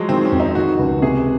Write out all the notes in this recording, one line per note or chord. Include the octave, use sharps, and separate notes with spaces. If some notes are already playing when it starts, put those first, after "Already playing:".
Already playing: F3 F#3 G#3
D#3 C4
C#4
F2
D#4
D#3 F#4
C#2
C3 G#4